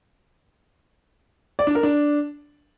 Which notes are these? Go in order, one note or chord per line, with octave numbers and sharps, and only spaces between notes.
D5
D4
A#4
D4